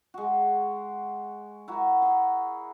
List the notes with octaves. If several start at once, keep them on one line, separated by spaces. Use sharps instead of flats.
G#3 F#4
E4 F#4 A#4
G#4 A#4